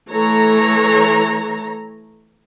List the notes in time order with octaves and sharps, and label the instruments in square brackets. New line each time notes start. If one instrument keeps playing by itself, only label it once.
[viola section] E3 A3 A4 C#5 A#5